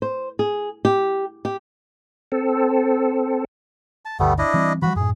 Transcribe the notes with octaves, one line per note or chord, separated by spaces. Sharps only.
C5
G#4
G4
G4
C4 A4
A5
G1 D2 G3 A3 B3
D4 E4 D#5
E3 G3 C4
E3 F3 G3 F#4 B5
F#2 A2 G#4